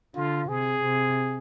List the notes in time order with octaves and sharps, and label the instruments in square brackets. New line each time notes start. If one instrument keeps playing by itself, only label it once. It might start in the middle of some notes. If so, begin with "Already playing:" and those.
[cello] D3 [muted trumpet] F4
[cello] C3 [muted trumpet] G#4
[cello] C3